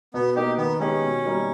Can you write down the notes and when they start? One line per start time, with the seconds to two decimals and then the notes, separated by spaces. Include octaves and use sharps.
0.14 B2 B3
0.36 A#3 D#4 G4
0.57 D#3 B3
0.80 G#3 B3 C#4 D#4 G4
1.02 B2
1.25 G3 A#3 D#4 A#4